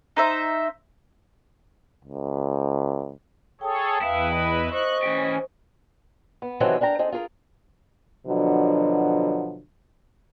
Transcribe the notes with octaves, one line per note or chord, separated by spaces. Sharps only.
D#4 C5 E5
C#2
G#4 A4 C#5 G5 A5 D#6
E2 E4 B4 E5 F5
D#5 B5
C5 D#5 C#6 F#6
E3 C#4 G4
B3
C3 D#3 E3 F#3 C4 A4
D4 A#4 G5 A#5
C4 D#4 G#4 A4
F4 G#4 A#4
B2 D3 F3 F#3 D4